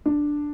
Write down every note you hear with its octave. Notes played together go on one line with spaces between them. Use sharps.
D4